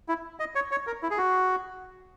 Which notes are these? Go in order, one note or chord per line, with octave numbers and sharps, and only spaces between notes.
E4
D#5
C#5
C#5
A#4
E4
G#4
F#4